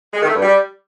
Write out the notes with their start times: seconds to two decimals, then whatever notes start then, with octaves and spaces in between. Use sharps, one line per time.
0.14 G#3
0.20 D#3
0.27 A3
0.34 G2
0.41 G3